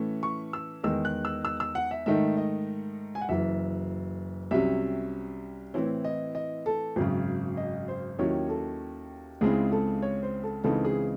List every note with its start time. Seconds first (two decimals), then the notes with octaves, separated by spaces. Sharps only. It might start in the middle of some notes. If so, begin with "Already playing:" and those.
Already playing: A2 E3 A3 C#4
0.23 C#6
0.53 E6
0.84 E2 D#3 G#3 D#4 E6
1.05 F#6
1.25 E6
1.45 E6
1.60 E6
1.75 F#5
1.91 E5
2.06 G#2 D#3 A3 D#4 E5
2.37 D#5
3.15 G#5
3.21 F#5
3.29 F#1 F#2 E3 E5
4.51 C2 C3 F#3 C#4 E5
5.74 A2 E3 C4 E4 C#5
6.04 D#5
6.35 D#5
6.66 A4
6.96 G#1 F#2 C#3
7.57 D#5
7.88 C5
8.19 D#2 D#3 F#3 C#4 E4 C#5
8.49 A4
9.41 C#2 C#3 G#3 C4 E4 G#4
9.72 A4
10.02 C#5
10.23 C5
10.43 A4
10.64 C#2 C#3 E3 C4 D#4 A4
10.85 G#4